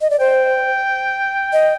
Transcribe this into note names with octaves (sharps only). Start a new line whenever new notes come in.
D#5
D5
C5 G5
D#5